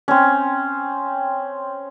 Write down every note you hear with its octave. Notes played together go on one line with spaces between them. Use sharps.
C4 C#4